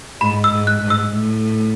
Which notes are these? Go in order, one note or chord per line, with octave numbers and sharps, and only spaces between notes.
G#2 B5
E6
G#2
F#6
G#2
E6
A2